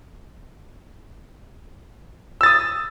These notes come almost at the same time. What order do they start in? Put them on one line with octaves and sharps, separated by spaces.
E6 A6 D#6